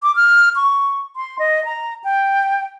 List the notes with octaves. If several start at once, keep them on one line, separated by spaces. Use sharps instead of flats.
D6
F6
C#6
C6
D#5
A#5
G5